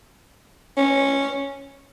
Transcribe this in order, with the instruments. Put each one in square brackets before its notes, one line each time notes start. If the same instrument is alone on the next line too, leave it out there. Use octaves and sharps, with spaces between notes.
[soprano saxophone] C#4